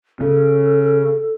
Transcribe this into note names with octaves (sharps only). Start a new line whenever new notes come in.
C#3 A4